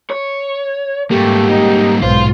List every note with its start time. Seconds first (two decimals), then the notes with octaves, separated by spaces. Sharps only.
0.10 C#5
1.11 G#2 G3 A3 A#3 G4
1.49 D#4
2.03 B1 G#2 F4 C5